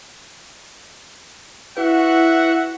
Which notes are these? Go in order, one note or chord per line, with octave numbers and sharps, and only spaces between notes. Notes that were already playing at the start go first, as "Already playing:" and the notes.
E4 F#4 B4 E5 F#5